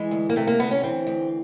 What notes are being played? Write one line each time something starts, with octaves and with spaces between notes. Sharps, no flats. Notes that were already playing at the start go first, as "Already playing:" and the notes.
Already playing: E3 G#3
D2
A#3
C3 A3
A#3
D2 B3
C#4
E3 C4
D2